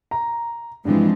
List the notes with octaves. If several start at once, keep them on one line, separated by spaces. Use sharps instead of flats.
A#5
G2 E3 F3 G#3 C4